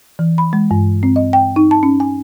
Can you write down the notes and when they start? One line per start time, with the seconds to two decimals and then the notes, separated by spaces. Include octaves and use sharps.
0.19 E3
0.38 B5
0.53 G#3
0.71 G2
1.03 C4
1.16 D#5
1.33 G5
1.56 D#4
1.71 A5
1.83 C#4
2.00 G#5